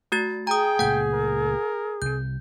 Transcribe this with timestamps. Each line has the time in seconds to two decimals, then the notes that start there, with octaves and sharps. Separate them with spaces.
0.12 A3 F#4 A6
0.47 G#4 G5 A#5 D#6
0.79 C#2 A#2 A3 F#5 G6
1.13 A#4
2.02 C2 C3 G6